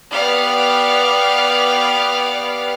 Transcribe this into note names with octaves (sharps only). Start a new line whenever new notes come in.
B3 G4 B4 D5 F5